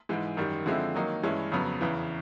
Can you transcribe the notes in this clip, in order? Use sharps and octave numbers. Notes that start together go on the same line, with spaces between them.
G#2 E3 G#3
F#2 D#3 G3
D3 F3 G#3 C4 E4
D#3 F#3 A#3 D#4
G2 E3 G#3 C#4 E4
F2 C#3 F#3 B3
E2 C#3 E3